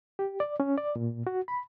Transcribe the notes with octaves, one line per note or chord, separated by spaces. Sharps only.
G4
D5
C#4
D5
A#2
F#4
B5